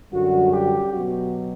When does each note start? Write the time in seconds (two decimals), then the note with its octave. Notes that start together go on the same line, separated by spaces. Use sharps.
0.12 F#2 D3 G3 F#4
0.52 G4
0.93 B2 F#3 F#4